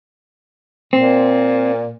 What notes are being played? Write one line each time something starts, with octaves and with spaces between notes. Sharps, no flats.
A#2 C4